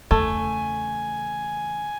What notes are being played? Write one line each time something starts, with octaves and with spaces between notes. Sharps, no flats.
E2 C#3 A3 G#5